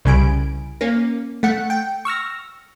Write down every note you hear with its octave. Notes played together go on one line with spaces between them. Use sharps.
C2 C#3 G3 G#5 B5 D7
A#3 C#4
A3 F#5 C#7
G5
C#6 E6 F6 A#6